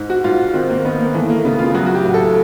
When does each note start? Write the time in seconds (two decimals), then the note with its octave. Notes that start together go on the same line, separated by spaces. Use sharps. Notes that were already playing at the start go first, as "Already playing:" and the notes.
Already playing: G#2
0.10 F#4
0.24 G#2 F4
0.54 D#3 C4
0.70 A#3
0.85 D#3 B3
0.99 A#3
1.14 E3 A3
1.30 A#3
1.45 C#3 B3
1.59 F4
1.74 F#3 F#4
1.86 F#4
1.95 G4
2.05 A2
2.14 A4